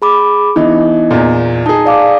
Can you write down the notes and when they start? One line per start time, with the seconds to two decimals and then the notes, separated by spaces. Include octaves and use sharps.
0.02 G#4 B5 D6
0.56 E3 B3 D#4 D#5
1.11 E2 A#2
1.66 D#4 G#4 A5
1.86 D5 F5 D6